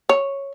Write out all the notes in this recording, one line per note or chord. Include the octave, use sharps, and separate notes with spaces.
C#5